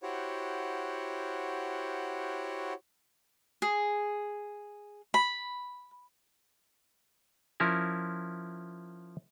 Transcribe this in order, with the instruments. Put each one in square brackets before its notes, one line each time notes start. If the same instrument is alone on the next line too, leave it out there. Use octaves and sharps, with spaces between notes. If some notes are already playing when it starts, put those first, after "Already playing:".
[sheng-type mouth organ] E4 F#4 G4 C5 C#5 F#5
[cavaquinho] G#4
B5
[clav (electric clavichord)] F3 C#4 E4 A#4